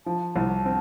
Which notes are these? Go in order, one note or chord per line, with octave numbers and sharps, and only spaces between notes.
F3 A5
C2
C4